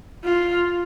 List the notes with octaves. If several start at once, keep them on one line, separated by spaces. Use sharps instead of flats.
F4